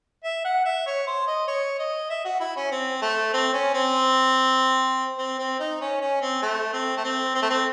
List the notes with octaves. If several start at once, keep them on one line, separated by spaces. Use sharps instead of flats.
E5
F#5
E5
C#5
C5
D#5
C#5
D#5
E5
F#4
E4
C#4
C4
A3
C4
C#4
C4
C4
C4
D#4
C#4
C#4
C4
A3
C4
A3
C4
C4
A3
C4